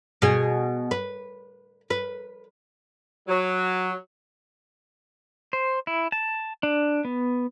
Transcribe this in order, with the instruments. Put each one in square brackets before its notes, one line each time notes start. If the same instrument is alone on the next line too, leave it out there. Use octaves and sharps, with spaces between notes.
[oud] B2 G#4
B4
B4
[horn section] F#3
[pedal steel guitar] C5
E4
A5
D4
B3